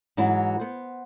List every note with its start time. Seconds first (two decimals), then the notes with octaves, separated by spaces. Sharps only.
0.17 G#2 E3 F#3 E4
0.60 B3 C5